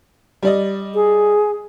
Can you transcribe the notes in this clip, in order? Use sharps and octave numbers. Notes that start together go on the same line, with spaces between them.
G3 D5 D#5
G#4